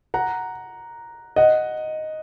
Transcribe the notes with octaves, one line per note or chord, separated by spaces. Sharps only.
F#5 A#5
D#5 F#5